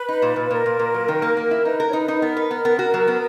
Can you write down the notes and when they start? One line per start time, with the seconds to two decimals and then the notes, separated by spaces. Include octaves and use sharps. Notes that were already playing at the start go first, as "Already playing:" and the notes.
Already playing: B4
0.08 D#4
0.22 A#2
0.36 A#2
0.51 A#2 A#4
0.66 A#2
0.79 A#2
0.94 F#3
1.08 D#3
1.22 A#3
1.37 A#3
1.51 E4
1.65 D#4 B4
1.80 A#4
1.87 C#5
1.93 D#4 B4
2.08 D#4
2.22 B3 A#4
2.37 B4
2.51 B3
2.65 B3
2.79 F#4
2.94 F#3
3.07 B3